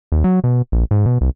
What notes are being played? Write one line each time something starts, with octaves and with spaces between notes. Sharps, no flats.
D#2
F#3
B2
A#1
G#2
B2
C2